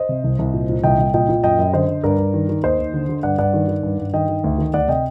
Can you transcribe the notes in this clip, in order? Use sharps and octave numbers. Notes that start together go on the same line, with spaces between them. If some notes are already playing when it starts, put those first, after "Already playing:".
Already playing: C5 D#5
C3
C2
C2
A#2
A#2
C2 D#5 G5
C2
A#2 D#5 G5
A#2
F#2 D#5 G5
F#2
D3 C5 D#5
D3
G2 A#4 D5
G2
D#3
D#3
D#2 C5 D#5
D#2
D3
D3
G2 D5 F#5
G2 D5 F#5
D#3
D#3
G2
G2
D#3 D#5 G5
D#3
D2
D#3
D2 D5 F#5
C3 D#5 G5